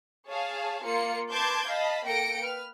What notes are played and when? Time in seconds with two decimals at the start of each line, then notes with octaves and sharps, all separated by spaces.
0.28 G#4 C#5 F5 A5
0.82 A#3 F4 C#7
1.31 B4 A5 C6 D6 G6 G#6
1.67 D#5 F5 A5 B5
2.06 A#3 A4 G5 A#6 C#7 D7
2.41 B4 F6